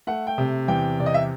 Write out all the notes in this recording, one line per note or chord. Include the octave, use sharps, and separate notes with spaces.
A3 F#5
G5
C3
E2 G5
C3 D5
D#5
E5